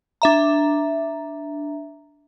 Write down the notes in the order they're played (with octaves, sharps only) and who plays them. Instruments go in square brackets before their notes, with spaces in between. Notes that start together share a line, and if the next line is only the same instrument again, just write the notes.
[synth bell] D4 E5 A#5